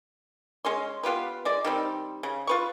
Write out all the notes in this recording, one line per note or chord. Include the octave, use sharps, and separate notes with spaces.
G#3 C#4 C6
B3 F4 G4 B4
G#3 D5
D#3 G3 C4
C#3
F4 B4 C#6